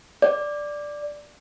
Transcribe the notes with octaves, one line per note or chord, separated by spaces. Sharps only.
D5